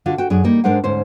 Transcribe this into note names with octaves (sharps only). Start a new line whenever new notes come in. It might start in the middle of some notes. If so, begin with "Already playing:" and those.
D3 D4 F4 F#4
F#4 G5
F#2 D4 G#4
G3 A#3 D#4
G#2 G#3 D4 A#4 C5 F#5
D2 G#2 C#4 C5